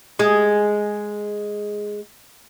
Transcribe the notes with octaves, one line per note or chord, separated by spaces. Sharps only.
G#3 G#4